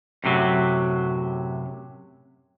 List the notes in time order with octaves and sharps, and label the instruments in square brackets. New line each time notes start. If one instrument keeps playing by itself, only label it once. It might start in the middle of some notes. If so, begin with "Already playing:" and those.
[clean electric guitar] F#2 A2 C3 F#3